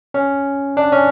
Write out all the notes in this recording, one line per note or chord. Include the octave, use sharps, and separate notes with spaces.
C#4
D4
C#4